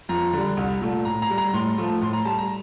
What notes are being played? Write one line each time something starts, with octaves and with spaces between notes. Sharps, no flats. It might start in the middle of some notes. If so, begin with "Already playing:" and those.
F2 A#5
D3 G3
C2
A#2 A3
A2 A#5
A#5
G3
A#5
A2 C6
F3 A3
A2 C6
A#5
G3 A5
A#5